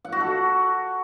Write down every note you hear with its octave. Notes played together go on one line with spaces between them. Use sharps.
F#5
F#4
A4